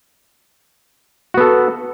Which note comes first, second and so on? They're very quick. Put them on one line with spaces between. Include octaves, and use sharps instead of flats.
F#4 B3 A4